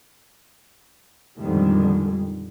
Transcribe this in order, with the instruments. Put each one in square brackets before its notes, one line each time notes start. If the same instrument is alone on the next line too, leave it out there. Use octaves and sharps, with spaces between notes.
[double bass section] F2 A#2 D3 D#3 G3 G#3